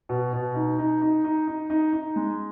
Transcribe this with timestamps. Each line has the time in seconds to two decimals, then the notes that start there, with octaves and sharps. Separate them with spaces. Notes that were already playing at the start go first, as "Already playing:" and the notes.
0.09 B2
0.33 B2
0.55 D#4
0.79 D#4
1.02 D#4
1.24 D#4
1.47 D#4
1.70 D#4
1.93 D#4
2.16 G#3